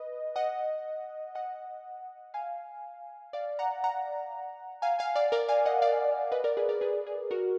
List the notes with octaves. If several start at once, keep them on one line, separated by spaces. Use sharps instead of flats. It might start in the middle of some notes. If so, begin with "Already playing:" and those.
Already playing: B4 D#5
D#5 F#5
D#5 F#5
F5 G#5
D5 F5
F#5 A#5
F#5 A#5
F5 G#5
F5 G#5
D5 F5
A#4 D5
F5 G#5
D#5 F#5
D5 F5
B4 D#5
A#4 D5
G#4 B4
A#4 D5
G#4 B4
G#4
F#4 A#4